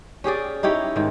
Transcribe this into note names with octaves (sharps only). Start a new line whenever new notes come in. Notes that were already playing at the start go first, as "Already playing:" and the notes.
C#4 G4 G#4 D5
D#4 E4 G4 C#5
G#2 D#3